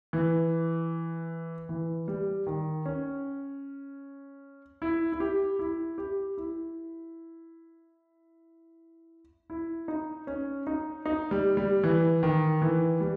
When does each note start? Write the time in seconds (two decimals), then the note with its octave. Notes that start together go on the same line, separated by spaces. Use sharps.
0.13 E3
1.69 E3
2.08 G3
2.47 D#3
2.86 C#4
4.82 E4
5.12 E4
5.20 G4
5.59 E4
5.98 G4
6.37 E4
9.50 E4
9.88 D#4
10.27 C#4
10.67 D#4
11.06 D#4
11.31 G3
11.57 G3
11.83 E3
12.23 D#3
12.62 E3
13.00 G3